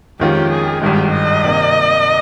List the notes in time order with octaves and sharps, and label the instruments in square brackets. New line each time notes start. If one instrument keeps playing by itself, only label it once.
[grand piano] F2 D#3 G#3 C#4 F4 [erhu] G4
[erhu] G#4
[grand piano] G#1 G2 D#3 G#3 [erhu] G4
[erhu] D#5
[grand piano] C3 D#3 A#3